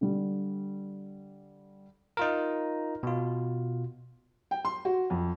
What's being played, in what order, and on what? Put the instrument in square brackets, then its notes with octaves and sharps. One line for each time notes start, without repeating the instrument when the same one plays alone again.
[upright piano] D3 G3
[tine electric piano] D#4 F4 A#4
B2 F4
[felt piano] G5
C6
F#4
F2